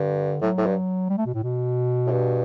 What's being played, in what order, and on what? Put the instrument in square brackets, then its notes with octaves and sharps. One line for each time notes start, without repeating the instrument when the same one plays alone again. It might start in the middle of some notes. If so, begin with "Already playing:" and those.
Already playing: [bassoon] G2 [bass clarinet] D3
[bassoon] A2 [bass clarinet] F#3
[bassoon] A2
G2
[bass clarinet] G3
A3
B2
A2
B2
[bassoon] A2
G2